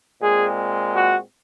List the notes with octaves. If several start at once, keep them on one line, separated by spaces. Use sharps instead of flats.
A#2 G#3 C4 G#4
F#4